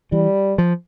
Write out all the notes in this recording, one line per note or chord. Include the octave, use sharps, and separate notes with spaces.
E3 G3
F3